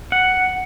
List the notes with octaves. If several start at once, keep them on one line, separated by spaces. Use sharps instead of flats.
F#5